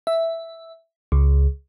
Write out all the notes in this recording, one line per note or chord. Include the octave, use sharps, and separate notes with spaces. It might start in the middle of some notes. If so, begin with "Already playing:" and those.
E5
C#2